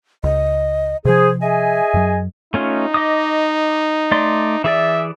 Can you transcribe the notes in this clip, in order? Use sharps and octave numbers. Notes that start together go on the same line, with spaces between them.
C#2 D#5
C3 F3 G#4 C5
G#4 D#5 E5 G#5
F#2 F#3
A3 C#4 D#4 F4
D#5 D6 D#6
A3 D5 C6
E3 G#4 D5 E5